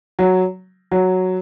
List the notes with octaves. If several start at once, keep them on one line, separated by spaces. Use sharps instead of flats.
F#3
F#3